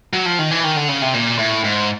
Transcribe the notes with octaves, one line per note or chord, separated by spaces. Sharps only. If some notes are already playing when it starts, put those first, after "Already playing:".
F#3
F3
D#3
E3
D#3
D3
C#3
C3
A#2
A2
G#2